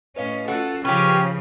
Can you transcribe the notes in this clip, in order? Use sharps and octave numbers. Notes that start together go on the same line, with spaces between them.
A2 C#4 B4 D#5 F5
C#4 F4 F#4 A4 F#6
C#3 F3 C#4 G4 B4 G5